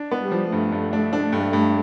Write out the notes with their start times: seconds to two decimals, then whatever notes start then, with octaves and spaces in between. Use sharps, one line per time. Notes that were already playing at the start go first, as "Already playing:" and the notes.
Already playing: D4
0.11 B3
0.21 G3
0.31 F3
0.52 G2 A3
0.72 G2
0.93 D4
1.13 D4
1.33 G2
1.53 G2